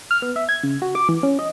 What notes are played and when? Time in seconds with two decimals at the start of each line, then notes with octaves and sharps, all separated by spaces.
0.11 F6
0.22 B3
0.36 E5
0.49 G#6
0.63 C#3
0.82 F#4
0.95 D6
1.09 E3
1.23 C#4
1.39 D#5